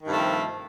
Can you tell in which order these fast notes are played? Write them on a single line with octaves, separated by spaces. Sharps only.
D#3 G2 C3 A3 F3